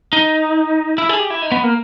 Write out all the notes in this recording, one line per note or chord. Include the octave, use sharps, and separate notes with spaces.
D#4
E4
G#4
G4
E4
D#4
B3
A#3